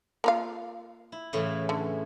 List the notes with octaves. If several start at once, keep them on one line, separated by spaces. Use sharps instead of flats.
A#3 F4 F5
E4
A2 C#3 E3
D3